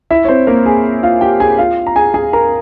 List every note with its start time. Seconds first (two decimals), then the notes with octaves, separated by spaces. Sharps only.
0.11 E4 E5
0.25 C#5
0.28 C4 C5
0.47 A#3 A#4
0.66 G#4
1.03 F4 F5
1.21 G4 G5
1.40 G#4 G#5
1.58 F4 F5
1.87 A#5
1.96 G#4 G#5
2.14 G#4 G#5
2.33 A#4 A#5